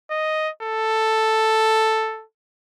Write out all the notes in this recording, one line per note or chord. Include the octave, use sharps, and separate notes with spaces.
D#5
A4